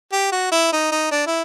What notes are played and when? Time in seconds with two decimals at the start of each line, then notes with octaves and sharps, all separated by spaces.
0.12 G4
0.32 F#4
0.52 E4
0.72 D#4
0.92 D#4
1.11 D4
1.27 E4